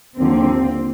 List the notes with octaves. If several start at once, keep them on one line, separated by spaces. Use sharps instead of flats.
D#2 D3 F3 C4